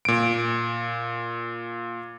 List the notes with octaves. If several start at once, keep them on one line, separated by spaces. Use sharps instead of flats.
A#2 D7